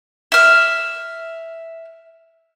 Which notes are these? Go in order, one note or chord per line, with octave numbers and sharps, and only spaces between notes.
E5 F6